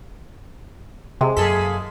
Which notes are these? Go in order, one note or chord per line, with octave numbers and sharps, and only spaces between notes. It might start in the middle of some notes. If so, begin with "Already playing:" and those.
C3 G#3
F#2 A#3 G#4 A4 B6